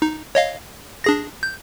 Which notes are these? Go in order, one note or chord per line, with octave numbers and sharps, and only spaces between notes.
D#4
C#5 D#5 F5
D4 G#4 A#6
G6